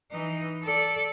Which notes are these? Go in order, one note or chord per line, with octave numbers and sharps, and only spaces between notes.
E3 D#4
A4 D5